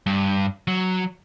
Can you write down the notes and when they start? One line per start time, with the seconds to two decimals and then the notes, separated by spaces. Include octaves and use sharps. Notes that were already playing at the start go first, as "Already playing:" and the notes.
0.06 G2
0.68 F#3